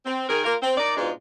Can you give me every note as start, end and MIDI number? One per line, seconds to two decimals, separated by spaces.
0.06 0.25 60
0.29 0.44 51
0.29 0.44 68
0.29 0.44 70
0.44 0.55 58
0.44 0.55 65
0.44 0.55 70
0.62 0.75 60
0.77 0.93 63
0.77 0.93 70
0.77 0.93 74
0.97 1.11 44
0.97 1.11 47
0.97 1.11 56
0.97 1.11 62
0.97 1.11 65